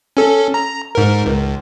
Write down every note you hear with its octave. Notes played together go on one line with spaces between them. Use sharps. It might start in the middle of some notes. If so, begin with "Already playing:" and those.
C#4 A4
A#5
G#2 A#4
C#2